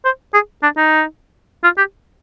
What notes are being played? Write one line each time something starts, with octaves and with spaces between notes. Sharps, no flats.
C5
G#4
D4
D#4
F4
G4